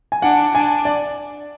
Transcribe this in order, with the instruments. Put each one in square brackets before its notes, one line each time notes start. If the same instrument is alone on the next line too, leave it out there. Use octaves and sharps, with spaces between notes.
[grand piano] G#5
[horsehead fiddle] D4 [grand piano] F#5
[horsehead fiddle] D4 [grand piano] G#5
[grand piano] D5